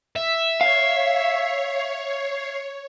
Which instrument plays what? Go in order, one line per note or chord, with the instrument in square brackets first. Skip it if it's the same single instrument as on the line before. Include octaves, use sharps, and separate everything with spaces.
[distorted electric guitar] E5
[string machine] C#5 [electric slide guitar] F5